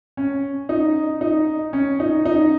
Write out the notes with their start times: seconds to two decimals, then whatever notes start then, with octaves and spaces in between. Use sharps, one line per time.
0.17 C#4
0.69 D#4
1.21 D#4
1.73 C#4
2.00 D#4
2.25 D#4